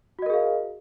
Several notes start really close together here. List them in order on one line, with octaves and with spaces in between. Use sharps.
F#4 D#5 A#4 G#4 F5